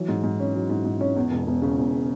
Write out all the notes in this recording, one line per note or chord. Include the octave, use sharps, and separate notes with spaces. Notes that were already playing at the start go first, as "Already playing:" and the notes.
Already playing: E3 F#3
G#2
G#2
C#4
F#3
G#2
G#2
C#4
E2
E1
E1
C#3
E2